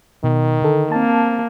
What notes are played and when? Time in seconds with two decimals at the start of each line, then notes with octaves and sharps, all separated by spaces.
0.24 B2 D#3
0.62 D3 A4
0.92 A#3 C4 A5